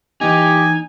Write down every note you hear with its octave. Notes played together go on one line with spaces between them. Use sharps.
E3 A#3 D#4 G4 G#5